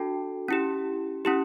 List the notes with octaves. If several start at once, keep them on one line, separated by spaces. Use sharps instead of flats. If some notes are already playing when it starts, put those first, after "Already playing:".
Already playing: D4 F#4 A4 G5 A5
C#4 E4 G4
C#4 E4 G4